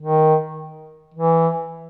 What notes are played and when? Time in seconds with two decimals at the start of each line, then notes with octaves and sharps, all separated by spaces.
0.01 D#3
1.14 E3